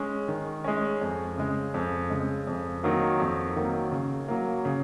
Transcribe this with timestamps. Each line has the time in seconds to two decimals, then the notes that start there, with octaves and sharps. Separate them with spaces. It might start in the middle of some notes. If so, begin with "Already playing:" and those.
Already playing: G#3 C#4
0.28 D#3
0.64 G#3 C#4
1.01 F2
1.37 C#3 G#3
1.74 F2
2.10 C#3 G#3
2.47 F2
2.83 D#3 F#3 A#3
3.20 F2
3.56 D#3 F#3 A#3
3.92 C#3
4.28 F#3 A#3
4.65 C#3